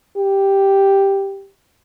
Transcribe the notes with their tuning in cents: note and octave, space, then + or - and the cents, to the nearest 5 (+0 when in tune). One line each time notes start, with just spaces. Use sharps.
G4 +0